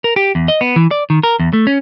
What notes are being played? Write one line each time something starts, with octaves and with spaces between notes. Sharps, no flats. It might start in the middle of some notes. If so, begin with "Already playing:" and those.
A#4
G4
E2
D#5
B3
E3
D5
D#3
A#4
E2
A3
C#4